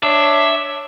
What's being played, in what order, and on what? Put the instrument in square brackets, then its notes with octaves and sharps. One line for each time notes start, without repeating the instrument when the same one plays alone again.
[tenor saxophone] D4 [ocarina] C#5 [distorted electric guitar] E5